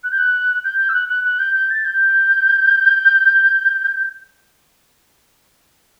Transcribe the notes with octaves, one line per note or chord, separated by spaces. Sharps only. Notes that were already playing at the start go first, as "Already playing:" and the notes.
F#6
G6
F#6
G6
G6
E6
F#6
F#6
F#6
G6
G6
A6
G6